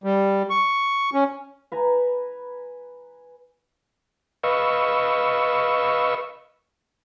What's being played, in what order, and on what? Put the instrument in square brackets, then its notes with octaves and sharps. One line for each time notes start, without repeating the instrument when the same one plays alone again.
[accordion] G3
C#6
C#4
[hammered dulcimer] B4 G#5 A#5
[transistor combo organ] B4 D#5 F5 C#6 E6